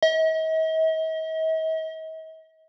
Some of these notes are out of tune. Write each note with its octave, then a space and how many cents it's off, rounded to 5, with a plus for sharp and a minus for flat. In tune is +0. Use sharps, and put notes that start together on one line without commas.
D#5 +45